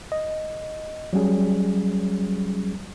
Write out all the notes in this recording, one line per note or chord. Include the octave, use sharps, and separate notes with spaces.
D#5
F#3 G3 C#4 G#4